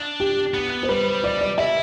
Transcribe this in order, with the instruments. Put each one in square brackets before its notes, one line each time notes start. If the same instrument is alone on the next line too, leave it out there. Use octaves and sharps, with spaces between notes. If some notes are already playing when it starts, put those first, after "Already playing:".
Already playing: [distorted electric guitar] D4
[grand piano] G4
[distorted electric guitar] B3
[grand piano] C5
[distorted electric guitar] G3 [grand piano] B4
[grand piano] D5
D5
[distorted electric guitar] E4 [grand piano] E5